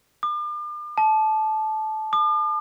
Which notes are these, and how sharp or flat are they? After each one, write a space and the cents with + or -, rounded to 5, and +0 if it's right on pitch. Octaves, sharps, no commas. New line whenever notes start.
D6 +40
A5 -20
D6 +45